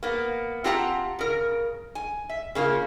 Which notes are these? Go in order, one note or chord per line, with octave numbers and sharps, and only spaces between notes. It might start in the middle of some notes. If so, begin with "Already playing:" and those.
A#3 B3
C4 F4 G4 F#5 A5 A#5
C#3 A#4
G#5
E5
C#3 A#3 C#4 F4